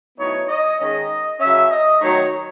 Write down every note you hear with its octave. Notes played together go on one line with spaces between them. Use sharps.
A2 F#3 B3 D#4 C#5
D#5
D#3 G#3 C#4 D#5
C#3 F#3 C#4 E5
D#5
D#3 F#3 A3 D#4 C#5